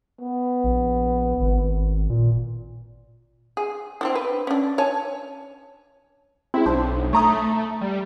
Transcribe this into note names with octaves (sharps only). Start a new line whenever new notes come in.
B3
A#1
G#1
A#2
G#4
C4 D4 E4
B4
C#4 D4
C#5 G#5 A5
G#3 C4 E4
B1 D4 C5
A3 C#5 A#5 D#6
G3